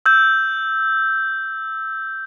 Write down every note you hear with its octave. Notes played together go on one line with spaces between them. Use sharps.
E6 G6